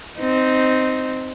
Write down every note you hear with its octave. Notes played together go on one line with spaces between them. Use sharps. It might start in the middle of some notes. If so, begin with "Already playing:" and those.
C4 D#4